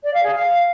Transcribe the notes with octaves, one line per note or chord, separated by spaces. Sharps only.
D5
F5
G#4
F5